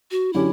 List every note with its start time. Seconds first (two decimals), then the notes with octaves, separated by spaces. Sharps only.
0.11 F#4
0.33 D3 F#3 C#4 E4 G4